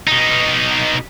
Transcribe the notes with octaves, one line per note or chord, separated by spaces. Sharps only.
B2 D#4